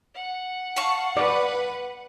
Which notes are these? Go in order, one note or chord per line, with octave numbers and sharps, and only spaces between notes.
F#5
F5 A5 C#6
B4 D5